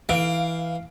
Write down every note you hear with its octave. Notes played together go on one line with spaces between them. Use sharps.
E3 F5 D7